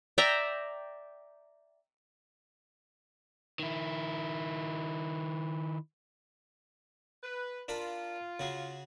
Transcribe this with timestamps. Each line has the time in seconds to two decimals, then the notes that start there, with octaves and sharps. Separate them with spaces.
0.18 D5 E5 G5 A#5
3.59 D#3 E4
7.23 B4
7.68 D4 F4 A#4 B5
8.40 C#3 F#4 G#4